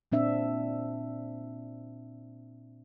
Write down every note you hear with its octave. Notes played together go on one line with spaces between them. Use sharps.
A#2 C4 D4 E5